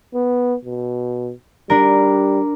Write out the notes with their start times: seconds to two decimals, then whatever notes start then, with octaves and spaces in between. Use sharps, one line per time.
0.14 B3
0.65 B2
1.70 G3 D4 A#4